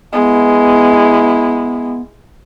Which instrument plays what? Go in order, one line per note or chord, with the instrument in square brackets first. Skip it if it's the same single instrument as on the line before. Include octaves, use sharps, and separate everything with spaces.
[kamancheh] G#3 E4 [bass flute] B3